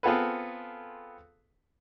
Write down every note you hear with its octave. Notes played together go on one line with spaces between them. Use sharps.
B3 C4 F4 G#4 A4 B4